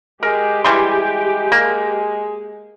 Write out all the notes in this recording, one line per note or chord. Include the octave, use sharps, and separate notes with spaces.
G#3 G4 A#4
E3 G3 G#3 C6
A#3